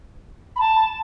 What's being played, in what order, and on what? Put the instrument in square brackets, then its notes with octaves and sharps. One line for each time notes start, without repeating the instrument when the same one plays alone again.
[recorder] B5
A5